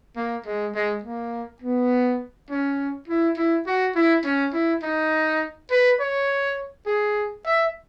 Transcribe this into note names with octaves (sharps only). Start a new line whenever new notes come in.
A#3
G#3
G#3
A#3
B3
C#4
E4
E4
F#4
E4
C#4
E4
D#4
B4
C#5
G#4
E5